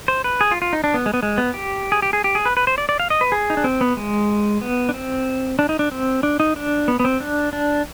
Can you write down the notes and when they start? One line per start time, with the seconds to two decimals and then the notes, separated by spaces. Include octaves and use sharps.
0.08 C5
0.24 B4
0.41 G#4
0.51 F4
0.62 F4
0.73 D#4
0.84 D4
0.94 B3
1.06 G#3
1.14 B3
1.23 G#3
1.38 B3
1.54 G4
1.92 G#4
2.02 G4
2.13 G#4
2.24 G4
2.35 G#4
2.46 B4
2.57 B4
2.67 C5
2.78 D5
2.89 D5
3.00 F5
3.10 D#5
3.21 B4
3.32 G#4
3.50 D#4
3.57 D4
3.64 C4
3.81 B3
3.97 G#3
4.61 B3
4.89 D4
4.94 C4
5.59 D4
5.69 D#4
5.79 D4
5.91 C4
6.23 D4
6.40 D#4
6.56 D4
6.88 B3
7.00 B3
7.05 C4
7.20 D4
7.53 D4